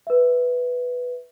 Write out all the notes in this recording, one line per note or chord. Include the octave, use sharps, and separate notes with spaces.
B4 E5